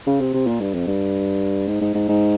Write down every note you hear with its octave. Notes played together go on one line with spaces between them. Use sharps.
C#3
C3
C3
A#2
G2
F2
G2
G#2
G#2
G#2
G#2